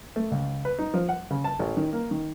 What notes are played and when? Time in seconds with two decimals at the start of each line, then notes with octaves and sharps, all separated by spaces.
0.16 A3
0.32 C#2
0.65 B4
0.79 D#4
0.94 F3
1.09 F#5
1.30 C#3
1.44 A5
1.60 A1
1.77 D#3
1.93 A#3
2.11 D#3